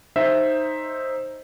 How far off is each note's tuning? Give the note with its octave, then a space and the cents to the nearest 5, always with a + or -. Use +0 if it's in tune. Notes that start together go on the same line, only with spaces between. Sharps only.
D#4 +0 C5 +10 E5 +0